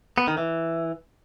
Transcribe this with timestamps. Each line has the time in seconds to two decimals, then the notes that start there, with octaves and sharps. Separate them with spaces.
0.18 B3
0.28 D#3
0.38 E3